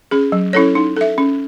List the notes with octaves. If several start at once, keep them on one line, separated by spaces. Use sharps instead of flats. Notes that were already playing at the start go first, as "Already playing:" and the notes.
C#4 G#4
F#3
C#4 E4 A4 C#5
D#4
A4 E5
C#4